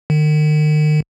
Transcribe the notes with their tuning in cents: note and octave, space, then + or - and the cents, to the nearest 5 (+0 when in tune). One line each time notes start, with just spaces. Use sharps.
D#3 -40